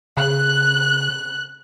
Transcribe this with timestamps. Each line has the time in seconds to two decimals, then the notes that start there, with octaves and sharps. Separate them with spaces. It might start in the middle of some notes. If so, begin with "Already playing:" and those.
0.17 C#3 F#6